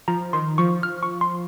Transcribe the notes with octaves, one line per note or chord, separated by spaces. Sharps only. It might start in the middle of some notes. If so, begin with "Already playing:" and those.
F3 A#5
D#3 C6
F3 C#6
F6
C#6
C6